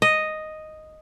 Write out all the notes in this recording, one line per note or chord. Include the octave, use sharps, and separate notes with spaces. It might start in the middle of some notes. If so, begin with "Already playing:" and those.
D#5